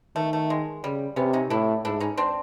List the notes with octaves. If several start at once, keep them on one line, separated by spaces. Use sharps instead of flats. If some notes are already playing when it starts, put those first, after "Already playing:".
D#3 A3
A3
G#3
C#3 G3
C3 B3 C#4
C#4 D#4
A2 D4 E4
G#2 D4 E4
C#4 D#4
C4 D4